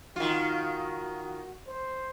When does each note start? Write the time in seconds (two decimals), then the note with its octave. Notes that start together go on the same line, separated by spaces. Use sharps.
0.16 D#3 F4 F#4
1.67 C5